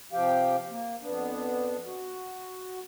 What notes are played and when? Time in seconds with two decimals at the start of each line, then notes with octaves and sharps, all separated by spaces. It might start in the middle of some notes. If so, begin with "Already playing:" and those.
0.13 C3 F3 G4 F5 G5
0.70 A#3
1.02 F2 B3 D4
1.86 F#4